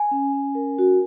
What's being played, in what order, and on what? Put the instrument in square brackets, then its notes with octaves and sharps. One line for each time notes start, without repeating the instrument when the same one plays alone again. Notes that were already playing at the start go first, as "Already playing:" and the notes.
Already playing: [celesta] G#5
[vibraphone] C#4
C#4
A#4
F#4